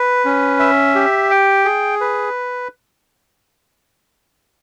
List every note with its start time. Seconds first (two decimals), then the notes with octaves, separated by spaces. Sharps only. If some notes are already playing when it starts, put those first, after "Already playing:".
Already playing: B4
0.25 C#4
0.60 E5
0.95 G4
1.31 G5
1.65 G#4
2.01 B4